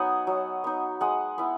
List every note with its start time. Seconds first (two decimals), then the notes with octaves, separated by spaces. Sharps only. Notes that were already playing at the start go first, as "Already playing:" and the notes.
Already playing: F#3 B3 D#4 D#5 F#5 G#5
0.27 F#3
0.64 B3 D#4
1.01 G#3 D#5 F#5
1.38 B3 E4